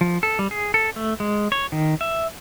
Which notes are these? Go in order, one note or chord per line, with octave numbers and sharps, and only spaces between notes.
F3
A4
G3
G#4
A4
A3
G#3
C#5
D#3
E5